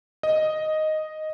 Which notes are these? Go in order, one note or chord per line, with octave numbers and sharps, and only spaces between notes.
D#5